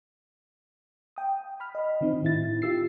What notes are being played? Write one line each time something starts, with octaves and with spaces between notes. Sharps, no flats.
G5 D#6
B5 F6
D#5 B5
D#3 C4 D#4
A2 E4 A6
F4 G4 E6 C7